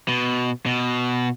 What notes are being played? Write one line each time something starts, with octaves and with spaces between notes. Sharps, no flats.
B2
B2